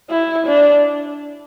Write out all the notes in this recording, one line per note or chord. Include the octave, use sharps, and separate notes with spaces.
E4
D4